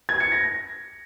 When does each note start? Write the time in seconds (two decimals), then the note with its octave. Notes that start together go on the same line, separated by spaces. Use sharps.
0.09 G#6
0.20 C#7
0.32 A#6